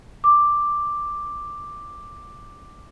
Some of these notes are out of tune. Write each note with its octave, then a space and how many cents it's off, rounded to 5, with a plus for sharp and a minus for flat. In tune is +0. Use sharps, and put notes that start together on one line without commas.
D6 +5